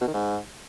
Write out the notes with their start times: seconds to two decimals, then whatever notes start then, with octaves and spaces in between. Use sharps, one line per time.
0.01 B2
0.08 D#3
0.14 G#2